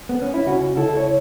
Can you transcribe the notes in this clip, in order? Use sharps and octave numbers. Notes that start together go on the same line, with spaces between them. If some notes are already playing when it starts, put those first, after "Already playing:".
B3
C#4
E4
C#2 C#4 F#4
C#2 E4 A4
C#5